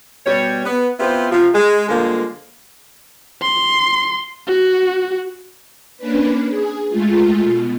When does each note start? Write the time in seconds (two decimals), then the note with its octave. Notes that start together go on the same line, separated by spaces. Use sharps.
0.25 B2 G3 C#5
0.64 B3
0.99 B3 C4 E4 F4 G4 C5
1.30 C3 F3 F4
1.53 G#3
1.88 D3 F3 G3 G#3 A#3
3.42 C6
4.47 F#4
5.97 A#3 C#4 D4 B4
6.49 G#4
6.89 G#3 A3 F4
7.43 B2